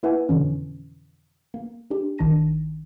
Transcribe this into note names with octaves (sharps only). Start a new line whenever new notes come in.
A#3 E4 B4 E5 F#5 G#5
F2 B2 D3 E3 C#4
A#3
D4 G4
A#1 D#3 D4 A5 A#6 D#7